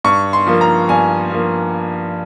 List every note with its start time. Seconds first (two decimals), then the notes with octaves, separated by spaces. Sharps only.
0.04 G2 C#6
0.33 C6
0.47 F3 A#3
0.61 A#5
0.89 G2 G#5
1.31 F3 A#3